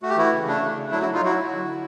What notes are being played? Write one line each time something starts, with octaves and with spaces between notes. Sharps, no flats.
A3 F#4
G4
E3 E4 F#4
C#3
A3 D4
C#3
A3
F#3 D4 E4
E4 F#4
F#3
D#4 F4
F#3 E4 F#4
F#3
D3
D3